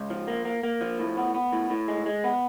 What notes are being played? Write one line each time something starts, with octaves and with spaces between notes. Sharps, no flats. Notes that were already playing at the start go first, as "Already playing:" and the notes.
Already playing: C#2
F3
A#3
A#3
A#3
F3
A2
B3
B3
A2
A2
G#3
G#3
B3